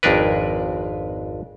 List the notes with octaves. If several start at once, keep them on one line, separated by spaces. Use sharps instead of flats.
G#1 F2 G#3 D4 A#4 B4